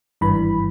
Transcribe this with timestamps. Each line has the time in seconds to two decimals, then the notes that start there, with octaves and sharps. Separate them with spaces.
0.21 G#1 G2 E3 B5